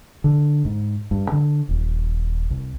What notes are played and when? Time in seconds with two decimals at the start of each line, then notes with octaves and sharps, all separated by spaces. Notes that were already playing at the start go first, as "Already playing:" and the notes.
0.24 D3
0.65 G#2
1.11 G2
1.32 D3
1.69 D#1
2.50 C2